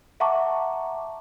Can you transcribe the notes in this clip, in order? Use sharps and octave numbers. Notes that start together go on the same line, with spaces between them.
E5 F#5 A5 A#5 C#6 D6